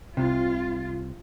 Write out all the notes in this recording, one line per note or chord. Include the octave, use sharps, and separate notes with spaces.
C2 C3 F4